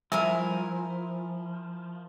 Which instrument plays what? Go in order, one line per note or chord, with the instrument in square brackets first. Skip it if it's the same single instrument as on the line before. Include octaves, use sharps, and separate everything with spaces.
[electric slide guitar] F3 [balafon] G3 [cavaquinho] E4 A#4 G#5